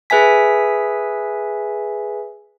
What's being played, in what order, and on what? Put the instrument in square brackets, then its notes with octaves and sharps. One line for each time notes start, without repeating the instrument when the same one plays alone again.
[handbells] G#4 B4 E5 G#5 B6